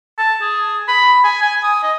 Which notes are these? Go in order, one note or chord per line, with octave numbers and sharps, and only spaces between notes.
A5
G#4
B5
G#5
G#5
D#6
D#5